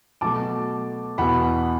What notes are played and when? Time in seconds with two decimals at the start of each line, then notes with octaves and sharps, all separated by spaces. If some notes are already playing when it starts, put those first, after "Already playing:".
0.21 B2 F#3 A3 A5 D6
1.18 E2 B2 B3 F#5 B5